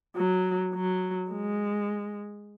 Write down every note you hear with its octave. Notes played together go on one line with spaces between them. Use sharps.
F#3
F#3
G#3